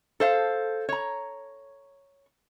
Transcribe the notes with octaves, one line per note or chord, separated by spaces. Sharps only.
A4 C5 F5
C#5 A#5